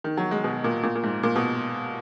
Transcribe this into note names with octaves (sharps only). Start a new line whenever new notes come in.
D#3
F#3
G#3
B2
A#2
A#2
A#2
G#2
A#2
B2